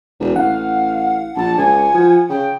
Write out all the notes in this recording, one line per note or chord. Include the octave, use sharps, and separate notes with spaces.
E1
A1 F5 F#5
A#1 A5
C#2 G#5
F3
C#3 G5